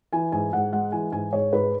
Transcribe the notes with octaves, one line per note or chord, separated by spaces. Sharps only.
E3 G#5
G#2 G#5
G#2 F#5
G#3 F#5
E3 G#5
G#2 G#5
G#2 C#5
G#2 B4